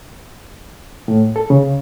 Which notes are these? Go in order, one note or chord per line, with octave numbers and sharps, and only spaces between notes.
A2
A4
C#3